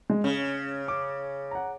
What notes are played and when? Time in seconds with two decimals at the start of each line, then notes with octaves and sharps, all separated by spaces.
0.10 G#3
0.24 C#3 C#4
0.88 D6
1.51 F#5 A#5